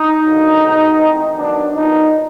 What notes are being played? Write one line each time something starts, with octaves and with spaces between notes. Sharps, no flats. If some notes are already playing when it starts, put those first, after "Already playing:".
Already playing: D#4
D3 F#3 A#3
B2 G#3 B3
E3 A3 C4
D#3 F#3 B3 D4
A#2 F#3 B3 D#4